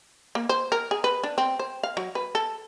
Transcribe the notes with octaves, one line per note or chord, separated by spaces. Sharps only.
A#3
C5
A#4
G#4
B4
D4
C4
C5
F5
F#3
B4
A4